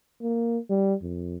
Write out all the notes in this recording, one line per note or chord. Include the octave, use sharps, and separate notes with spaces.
A#3
G3
F2